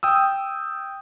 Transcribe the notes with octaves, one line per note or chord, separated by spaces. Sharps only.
G5 D#6 E6